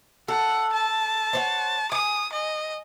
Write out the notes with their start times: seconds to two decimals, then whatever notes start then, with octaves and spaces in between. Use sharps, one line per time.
0.28 A4 F#5
0.73 A5
1.33 C5 C#5 F#5
1.92 G#5 D#6
2.33 D#5